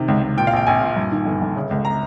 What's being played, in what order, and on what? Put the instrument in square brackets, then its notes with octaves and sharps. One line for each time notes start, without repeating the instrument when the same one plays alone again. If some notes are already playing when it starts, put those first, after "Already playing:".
Already playing: [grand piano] C3 D#3
C#2
C#2
A#2 G5
F5
A#1 G5
A#1 G#5
A#2
G2
D#3
G1
G1
C#3
C#2
A#5